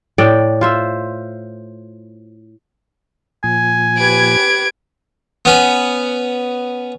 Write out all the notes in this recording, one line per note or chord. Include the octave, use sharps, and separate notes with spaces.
A2 D5 G5
F4 C5 E5
A#2 F3 G#5
G4 B4 G#6 D7
B3 C#4